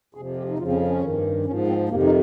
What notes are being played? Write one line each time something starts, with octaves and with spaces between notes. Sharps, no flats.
F2 C3 F3 G#4
G4
D#4
F2 C#3 F3 F4
C4
C#4
C#4
G2 D#3
G#2 F3 C#4
C4
F2 C3 D#3 A#3
D#4